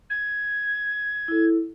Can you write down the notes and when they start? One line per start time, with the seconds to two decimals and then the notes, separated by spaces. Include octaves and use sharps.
0.09 G#6
1.28 E4 A4